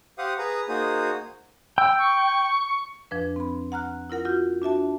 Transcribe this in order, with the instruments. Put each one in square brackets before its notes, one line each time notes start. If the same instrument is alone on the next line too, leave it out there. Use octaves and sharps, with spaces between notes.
[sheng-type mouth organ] G4 C5 F5 F#5 D#6
G#4 B4 A#5 D#6
A#3 D#4 F#4 G#4 C5 D#6
[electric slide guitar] G5 [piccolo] E6
[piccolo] C#6
[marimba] F2 F3 D4 B4
C4 B5
F#5 A#5 F6 F#6
E4 F4 A#4 F#5
F4 F#4 G6
D4 F#4 E5 A5